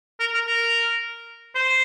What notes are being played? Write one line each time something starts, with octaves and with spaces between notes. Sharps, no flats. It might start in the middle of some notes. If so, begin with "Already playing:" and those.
A#4
A#4
A#4
C5